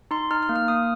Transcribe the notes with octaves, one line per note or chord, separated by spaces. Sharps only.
D#4 C6
D#4 F6
F6
A#3
F6
A#3 D#6